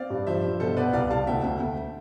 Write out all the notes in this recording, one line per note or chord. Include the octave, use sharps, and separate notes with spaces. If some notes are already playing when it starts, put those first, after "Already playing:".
Already playing: C4 D5 F5
G2
F3 C5 E5
G2
B2 A4 C5
B3 B4 D5
C2 D5 F5
C2 F5 A5
D2 E5 G5
D2
D2